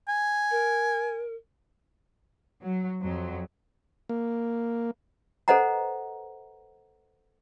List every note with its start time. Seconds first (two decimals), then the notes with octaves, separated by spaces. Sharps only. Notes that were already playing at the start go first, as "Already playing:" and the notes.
0.09 G#5
0.51 A#4
2.62 F#3
3.03 F2 F#3
4.09 A#3
5.48 A4 B4 C5 D#5 F#5 A#5